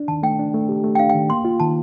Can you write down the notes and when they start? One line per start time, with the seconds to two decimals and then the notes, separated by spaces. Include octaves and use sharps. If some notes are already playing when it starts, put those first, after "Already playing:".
Already playing: D4
0.08 D#3 A5
0.23 A3 G5
0.39 D4
0.54 A3
0.69 G4
0.84 A3
0.95 G5
0.99 D4 F5
1.09 G5
1.15 D#3
1.30 A#3 C6
1.45 F4
1.60 D#3 A5